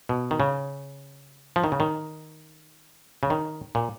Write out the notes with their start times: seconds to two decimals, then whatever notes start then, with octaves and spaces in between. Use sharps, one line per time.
0.09 B2
0.31 D#3
0.40 C#3
1.56 F3
1.64 D#3
1.72 C#3
1.80 D#3
3.23 C#3
3.30 D#3
3.75 A#2